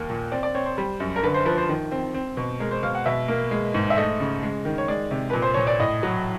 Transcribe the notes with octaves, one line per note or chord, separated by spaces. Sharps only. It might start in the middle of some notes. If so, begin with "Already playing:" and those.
Already playing: D#2 A#3
A#2
C4 D5
D5
C4 C#5
C5
G3
F#2
A#4
D3 B4
C5
F3 B4
C5
D#3
C4
C4
B2
G#3 A#4
C5
B2 F5
F#5
B2 E5
A#3
G#3
G#2
E5
A3 D#5
C#3
G#3
D#3
C#5
G#3 D5
C3
A#2 B4
C5
A#2 C#5
D5
A2 D#5
F#3